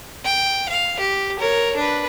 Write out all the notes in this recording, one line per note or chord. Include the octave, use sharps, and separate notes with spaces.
G5
F5
G4
A#4 C#5
D4 B4